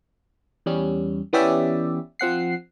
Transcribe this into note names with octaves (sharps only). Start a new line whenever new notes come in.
E2 G3 C#4
E3 B3 C#4 G4 D5 E5
F3 C4 F#5 C7